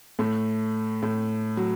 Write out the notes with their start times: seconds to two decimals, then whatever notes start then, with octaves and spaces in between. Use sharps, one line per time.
0.19 A2 A3
1.02 A2 A3
1.57 F#3